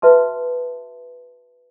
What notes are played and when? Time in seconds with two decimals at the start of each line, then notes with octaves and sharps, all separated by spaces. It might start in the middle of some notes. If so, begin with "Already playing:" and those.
0.02 F#4 B4 E5 A5 C6